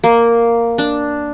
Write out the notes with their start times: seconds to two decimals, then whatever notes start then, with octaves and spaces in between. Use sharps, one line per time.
0.04 A#3
0.78 D4